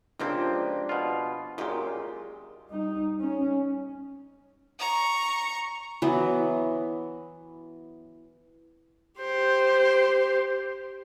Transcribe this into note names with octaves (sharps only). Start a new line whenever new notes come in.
C#2 F3 A#3 C4 D4 G4
B2 F4
F#2 A#2 G#3 F4 G4
G3 D#4
C#4
A#5 C#6
E3 F#3 B3
G4 C5